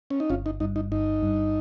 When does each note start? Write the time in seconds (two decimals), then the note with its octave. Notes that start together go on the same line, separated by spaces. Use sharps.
0.10 C#4
0.20 D#4
0.30 G1 C#4 F4
0.46 D#4
0.60 G2 D#4
0.76 D#4
0.91 G1 D#4
1.23 G2